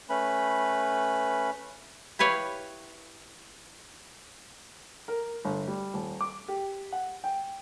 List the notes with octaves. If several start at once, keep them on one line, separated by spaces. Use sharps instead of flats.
A3 C#4 B4 B5
E4 G4 B4 C#5 F5
A#4
G1
G3
D#1
D6
G4
F#5
G5